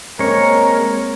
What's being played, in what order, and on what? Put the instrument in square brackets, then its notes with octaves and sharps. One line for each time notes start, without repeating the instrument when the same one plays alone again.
[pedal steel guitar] G#3 C#5 [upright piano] A#3 C4 [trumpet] A#4